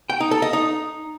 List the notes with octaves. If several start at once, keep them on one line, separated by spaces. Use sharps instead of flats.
G5
D#4
A4
D#5
D#4